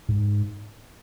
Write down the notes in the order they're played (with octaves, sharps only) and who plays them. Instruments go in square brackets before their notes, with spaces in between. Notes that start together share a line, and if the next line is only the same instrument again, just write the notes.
[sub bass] G#2